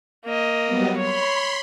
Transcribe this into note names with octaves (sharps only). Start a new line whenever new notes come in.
A#3 D#5
F#3 G3 B3
C#5 B5 C6